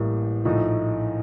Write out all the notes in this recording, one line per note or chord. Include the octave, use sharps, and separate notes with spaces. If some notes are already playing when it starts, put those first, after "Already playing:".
Already playing: A1 A2 G3 A#3
A#1 A2 A3 D#4 A4